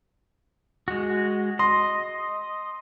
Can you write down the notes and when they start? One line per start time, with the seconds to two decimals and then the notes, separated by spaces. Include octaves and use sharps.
0.88 G#3 F#4
1.59 D#5 C6